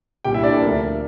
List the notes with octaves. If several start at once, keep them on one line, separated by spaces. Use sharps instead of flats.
C2 A#2 G3 G4 G5
E4 E5
D4 D5
A4
D2 C3 F3 A#4